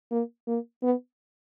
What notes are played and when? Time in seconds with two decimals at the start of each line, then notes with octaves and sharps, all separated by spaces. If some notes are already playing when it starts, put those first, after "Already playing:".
0.11 A#3
0.47 A#3
0.83 B3